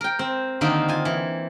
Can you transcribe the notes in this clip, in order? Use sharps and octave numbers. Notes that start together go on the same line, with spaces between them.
A#4 G5
C4
D3 D#3 A#3 C4 D#4 G4
F4 G#5
E3